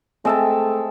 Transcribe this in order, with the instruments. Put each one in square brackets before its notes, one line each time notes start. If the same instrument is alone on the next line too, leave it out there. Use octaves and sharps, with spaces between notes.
[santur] G#3 E5 A5 [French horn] A3 [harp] C4